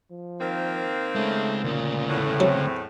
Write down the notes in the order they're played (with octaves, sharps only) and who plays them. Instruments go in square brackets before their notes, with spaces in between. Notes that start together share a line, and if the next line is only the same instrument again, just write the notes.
[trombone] F3
[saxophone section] D#3 A#3 C4
[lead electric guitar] G#3 C#4 [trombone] A3
[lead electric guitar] D2 C#3 [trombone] A#2
[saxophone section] E2 A2
[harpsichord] F#3 [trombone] C4